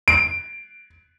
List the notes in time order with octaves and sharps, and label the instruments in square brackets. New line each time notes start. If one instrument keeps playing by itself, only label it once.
[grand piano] D7